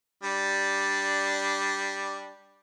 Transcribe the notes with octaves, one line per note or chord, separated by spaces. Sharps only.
G3 D4